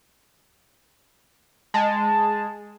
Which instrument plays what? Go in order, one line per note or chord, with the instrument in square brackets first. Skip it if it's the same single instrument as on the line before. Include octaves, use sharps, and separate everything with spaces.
[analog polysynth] G#3 [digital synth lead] A5